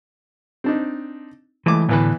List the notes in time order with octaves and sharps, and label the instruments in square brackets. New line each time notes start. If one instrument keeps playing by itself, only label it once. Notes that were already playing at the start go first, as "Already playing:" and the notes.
[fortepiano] C4 D4 D#4
[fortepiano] C#2 A3 D6 [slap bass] E3
[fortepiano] E2 E3 B4 [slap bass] A2 D3